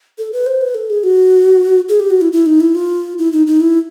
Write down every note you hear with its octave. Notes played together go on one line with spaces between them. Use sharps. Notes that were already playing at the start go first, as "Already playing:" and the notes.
A4
B4
C5
B4
A4
G#4
F#4
G#4
G4
F#4
E4
E4
D#4
E4
F4
E4
D#4
D#4
E4